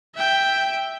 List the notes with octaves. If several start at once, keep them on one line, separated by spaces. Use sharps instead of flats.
E5 G5